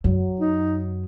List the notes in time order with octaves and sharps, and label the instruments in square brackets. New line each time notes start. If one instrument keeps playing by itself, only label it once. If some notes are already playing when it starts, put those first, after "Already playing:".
[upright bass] F#2 [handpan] F#3
[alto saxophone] D#4